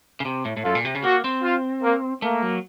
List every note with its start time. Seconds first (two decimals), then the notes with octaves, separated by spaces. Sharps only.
0.20 C#3
0.25 C3
0.45 A2
0.57 A2
0.65 F#2 F4 A4
0.75 A#2
0.85 C3
0.95 C#3
1.04 A#3 F#4
1.24 C4
1.43 F4
1.83 A#3
2.22 A3 A#3
2.42 F#3